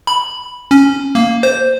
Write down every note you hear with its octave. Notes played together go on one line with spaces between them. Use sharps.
B5
C#4
A#3
C5